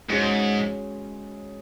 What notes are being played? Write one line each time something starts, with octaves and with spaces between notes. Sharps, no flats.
G#2 G#3 C#4 F#4 C#5